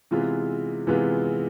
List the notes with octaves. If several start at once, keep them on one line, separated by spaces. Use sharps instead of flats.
C3 E3 G#3 B3 F4
C3 E3 G#3 B3 F4